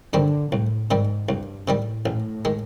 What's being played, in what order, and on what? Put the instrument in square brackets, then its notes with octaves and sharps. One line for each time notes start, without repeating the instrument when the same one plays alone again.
[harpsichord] G2 D#3 G3 C4 [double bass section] D3
[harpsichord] C2 [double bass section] A2
[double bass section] G#2 [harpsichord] C3 D#3 G3
[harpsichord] C2 [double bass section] G2
[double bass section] A2 [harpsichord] C3 D#3 G3
[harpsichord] A1 [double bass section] A2
[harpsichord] D#3 G#3